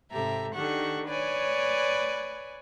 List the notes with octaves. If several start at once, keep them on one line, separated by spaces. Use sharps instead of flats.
G#2 C3 G4 A4 E5 A#5
D#3 D4 G4 A4 F#5 C#6
B4 C#5 D5 G#5